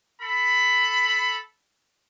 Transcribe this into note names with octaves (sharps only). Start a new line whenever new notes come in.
A4 B5